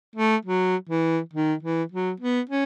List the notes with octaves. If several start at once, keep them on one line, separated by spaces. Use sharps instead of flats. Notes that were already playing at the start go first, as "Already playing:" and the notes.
A3
F#3
E3
D#3
E3
F#3
B3
C#4